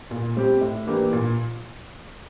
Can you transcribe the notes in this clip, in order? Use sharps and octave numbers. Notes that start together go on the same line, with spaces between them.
A#2
G3 C4 G4
A2
E3 A#3 D4 G4
A#2